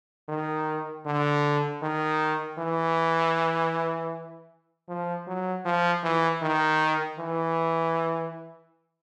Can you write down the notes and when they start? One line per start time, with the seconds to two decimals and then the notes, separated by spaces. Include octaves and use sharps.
0.29 D#3
1.06 D3
1.82 D#3
2.59 E3
4.88 F3
5.27 F#3
5.65 F3
6.04 E3
6.42 D#3
7.19 E3